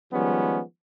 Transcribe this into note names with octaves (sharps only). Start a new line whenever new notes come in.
D#3 F3 G3 G#3 B3 C#4